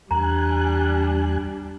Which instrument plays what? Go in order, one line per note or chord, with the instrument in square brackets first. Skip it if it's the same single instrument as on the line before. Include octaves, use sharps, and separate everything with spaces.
[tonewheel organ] E2 G#5 F#6 [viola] G3 D4 [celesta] A#5